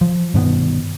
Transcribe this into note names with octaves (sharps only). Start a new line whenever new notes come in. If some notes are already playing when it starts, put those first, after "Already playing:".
F3
G2 B2 D#3 B3